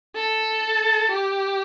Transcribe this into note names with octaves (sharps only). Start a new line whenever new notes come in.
A4
G4